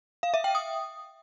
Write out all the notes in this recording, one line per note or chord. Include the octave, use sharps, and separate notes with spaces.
F5
E5
G5
D#6